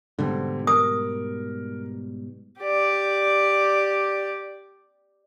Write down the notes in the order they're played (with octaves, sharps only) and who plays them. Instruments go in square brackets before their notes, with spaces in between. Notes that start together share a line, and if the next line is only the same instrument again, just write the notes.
[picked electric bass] G#2 B2 G3 [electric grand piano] D3 C4
[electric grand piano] A#4 [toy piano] D#6
[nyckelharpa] G4 D5